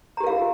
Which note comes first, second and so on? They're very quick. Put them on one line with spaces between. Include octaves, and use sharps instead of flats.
A#5 G4 A#4 F5 F4